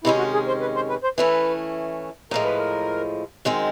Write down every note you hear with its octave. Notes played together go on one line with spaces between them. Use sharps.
C3 D#3 G#3 C#4 E4
F#4
G#4
C5
B4
C5
B4
C5
E3 A3 C#4 B4
A2 F3 G#3 A#4
B4
A#4
F#2 D#3 G#3 C4